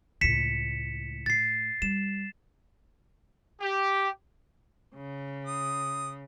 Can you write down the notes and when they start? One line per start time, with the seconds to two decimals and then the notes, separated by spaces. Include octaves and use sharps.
0.21 C#2 A2 B6 C#7 E7
1.26 A2 A6 C7
1.82 G3 E7
3.61 G4
4.96 C#3
5.47 D#6